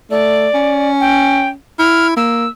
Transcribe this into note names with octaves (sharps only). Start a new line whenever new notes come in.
A3 D5
C#4
G5
E4 F6
A#3 E6